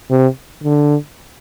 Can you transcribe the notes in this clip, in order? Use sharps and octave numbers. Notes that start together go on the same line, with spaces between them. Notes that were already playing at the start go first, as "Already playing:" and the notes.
C3
D3